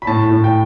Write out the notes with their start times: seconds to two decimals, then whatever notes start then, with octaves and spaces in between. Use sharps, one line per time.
0.02 B5
0.07 A2 A5
0.31 A2
0.44 G5